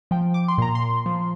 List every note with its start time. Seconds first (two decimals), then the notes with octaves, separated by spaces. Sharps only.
0.11 F3 G5
0.34 D6
0.48 C6
0.58 A#2 A#5
0.75 C6
1.06 F3